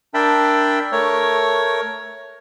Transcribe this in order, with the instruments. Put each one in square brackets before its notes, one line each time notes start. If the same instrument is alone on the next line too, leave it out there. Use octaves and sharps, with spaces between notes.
[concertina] D4 A#4 E5 G5 A5 B5
A3 A#4 C#5